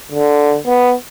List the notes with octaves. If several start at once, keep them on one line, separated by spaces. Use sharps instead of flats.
D3
B3